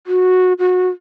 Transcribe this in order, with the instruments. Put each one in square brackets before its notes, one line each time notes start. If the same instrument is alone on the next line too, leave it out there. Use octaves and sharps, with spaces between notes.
[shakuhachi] F#4
F#4